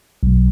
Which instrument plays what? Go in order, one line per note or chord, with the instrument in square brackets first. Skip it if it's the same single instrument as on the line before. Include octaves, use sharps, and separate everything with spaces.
[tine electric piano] B1